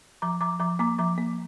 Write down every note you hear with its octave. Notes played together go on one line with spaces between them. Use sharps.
F3 A#5 D6
F3 A#5 D6
F3 A#5 D6
A#3 A#5 D6
F3 A#5 D6
A#3